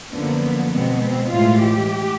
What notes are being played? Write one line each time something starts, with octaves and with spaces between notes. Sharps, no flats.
F#2 D3 F3 A#3 B3
B2 G#3 B3 C4
C4
A2 E3 G#3 F4
G4